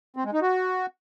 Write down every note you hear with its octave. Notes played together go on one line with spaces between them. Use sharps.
C4
G#3
D#4
F#4